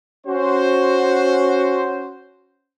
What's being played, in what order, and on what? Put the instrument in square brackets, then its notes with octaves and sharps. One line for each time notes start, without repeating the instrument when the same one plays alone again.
[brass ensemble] C#4 F#4 C5